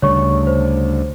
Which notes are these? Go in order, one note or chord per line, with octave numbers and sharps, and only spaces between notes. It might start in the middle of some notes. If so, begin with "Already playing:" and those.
D2 C#3 G3 A3 C#5 C#6
C5